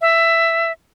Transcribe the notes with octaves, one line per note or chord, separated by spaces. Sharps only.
E5